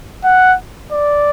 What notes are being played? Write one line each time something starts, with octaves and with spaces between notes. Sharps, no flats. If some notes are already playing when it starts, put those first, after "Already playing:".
F#5
D5